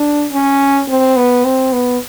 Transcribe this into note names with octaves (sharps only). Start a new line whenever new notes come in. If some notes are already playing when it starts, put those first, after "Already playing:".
Already playing: D4
C#4
C4
B3
C4
B3